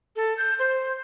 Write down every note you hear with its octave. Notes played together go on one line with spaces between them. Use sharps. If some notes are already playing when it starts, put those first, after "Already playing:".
A4
G6
C5